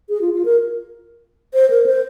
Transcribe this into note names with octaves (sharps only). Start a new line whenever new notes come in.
G#4
F4
F4
A#4
C5
A#4
C5